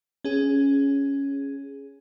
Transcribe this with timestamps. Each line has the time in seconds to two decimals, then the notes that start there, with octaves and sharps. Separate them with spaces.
0.24 C#4 G#4